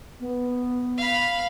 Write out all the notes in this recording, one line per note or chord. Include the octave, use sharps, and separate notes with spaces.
B3
F5 B5